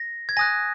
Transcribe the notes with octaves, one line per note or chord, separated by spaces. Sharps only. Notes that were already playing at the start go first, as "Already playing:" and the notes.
Already playing: A#6
G#6
G#5 D#6 F#6 A#6